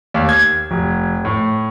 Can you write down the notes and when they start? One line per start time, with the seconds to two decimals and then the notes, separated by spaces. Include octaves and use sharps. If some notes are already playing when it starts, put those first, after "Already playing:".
0.14 D#2
0.29 G#6
0.71 F1
1.25 A2